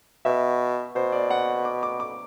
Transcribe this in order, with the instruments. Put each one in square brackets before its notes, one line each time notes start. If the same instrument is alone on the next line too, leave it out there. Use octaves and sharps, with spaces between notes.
[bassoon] B2 [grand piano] E5
[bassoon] B2 [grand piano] C5
[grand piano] D5
F#5
D6
D6
D6